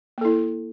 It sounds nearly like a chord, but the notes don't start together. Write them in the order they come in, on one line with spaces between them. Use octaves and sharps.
A#3 A4 E4